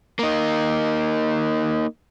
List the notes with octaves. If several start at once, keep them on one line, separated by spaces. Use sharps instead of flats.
A#3 D#4